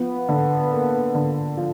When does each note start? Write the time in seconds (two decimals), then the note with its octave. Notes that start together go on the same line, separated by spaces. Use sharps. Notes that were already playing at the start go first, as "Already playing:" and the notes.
Already playing: F3 B3
0.29 D3
0.72 A#3
1.15 D3
1.57 F3